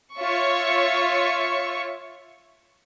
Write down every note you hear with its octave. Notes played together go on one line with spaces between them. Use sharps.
F4 C#5 E5 C#6